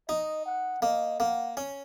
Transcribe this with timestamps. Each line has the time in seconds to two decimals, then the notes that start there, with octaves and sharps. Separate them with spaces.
0.09 D#4 D#5
0.46 F#5
0.82 A#3 D#5
1.20 A#3 F#5
1.57 C#4